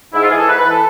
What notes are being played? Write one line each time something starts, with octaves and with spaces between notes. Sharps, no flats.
G#2 E4
F4
E3 G#4
A4
G#2 B4
B4
E3
A4